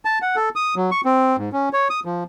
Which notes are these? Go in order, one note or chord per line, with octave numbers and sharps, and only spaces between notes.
A5
F#5
A4
D#6
F#3
C#6
C4
G#2
C#4
C#5
D#6
F3